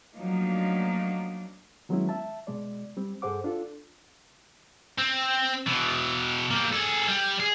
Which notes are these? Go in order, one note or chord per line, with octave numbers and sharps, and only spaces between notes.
F3 F#3 A3 A#3 D4 D#4
D#3 F#3 G#3 B3 C#4 E4
E5 A5
B2 G#3 D5
G3 C4
G2 G#4 A4 C5 F#5 D6
D4 F4 A4
C4
B2 E3
G3 A#3
G#4 A4
G3
G#4